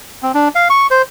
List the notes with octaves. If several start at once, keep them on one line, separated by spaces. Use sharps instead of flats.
C4
D4
F5
C#6
C5